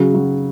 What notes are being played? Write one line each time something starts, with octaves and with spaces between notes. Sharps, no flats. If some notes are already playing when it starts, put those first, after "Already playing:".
Already playing: C#3 F#3
F#3